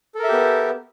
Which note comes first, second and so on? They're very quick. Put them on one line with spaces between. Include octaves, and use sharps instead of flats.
A4 A#4 E5 G4 B3